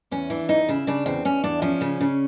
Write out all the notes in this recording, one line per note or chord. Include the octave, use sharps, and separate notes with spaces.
E2 C#4
E3 D4
E2 D#4
C#3 E4
C#3 D4
E2 C4
E2 C#4
E2 D4
F3 C#4
C#3
C#3